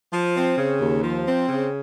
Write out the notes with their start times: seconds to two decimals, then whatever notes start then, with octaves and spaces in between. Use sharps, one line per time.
0.12 F3
0.36 C4
0.57 C#3
0.80 D#2
1.03 F3
1.26 C4
1.49 C#3